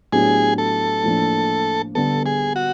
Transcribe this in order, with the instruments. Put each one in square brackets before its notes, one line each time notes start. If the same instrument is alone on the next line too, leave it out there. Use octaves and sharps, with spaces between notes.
[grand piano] A2 F#3 B3 D4 G4 [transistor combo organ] G#4
[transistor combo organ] A4
[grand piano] A2 F3 A#3 D4
[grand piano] D3 G3 B3 [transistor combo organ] A4
[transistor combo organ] G#4
F#4